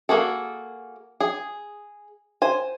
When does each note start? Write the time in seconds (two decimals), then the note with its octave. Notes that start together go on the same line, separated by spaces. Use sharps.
0.09 A#3 F#4 G#4 A4
1.20 G#4
2.42 C5 G#5